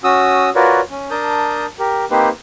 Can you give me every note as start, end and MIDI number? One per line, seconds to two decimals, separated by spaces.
0.04 0.50 61
0.04 0.50 66
0.04 0.50 87
0.04 0.50 88
0.55 0.80 65
0.55 0.80 66
0.55 0.80 70
0.55 0.80 71
0.55 0.80 73
0.55 0.80 74
0.91 1.10 61
1.11 1.66 62
1.11 1.66 70
1.11 1.66 81
1.11 1.66 87
1.11 1.66 91
1.79 2.05 67
1.79 2.05 70
2.11 2.29 58
2.11 2.29 60
2.11 2.29 63
2.11 2.29 67
2.11 2.29 71
2.11 2.29 72